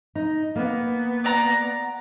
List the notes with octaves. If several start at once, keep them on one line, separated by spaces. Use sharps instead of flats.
D#4
A#3 B3
D5 F#5 A#5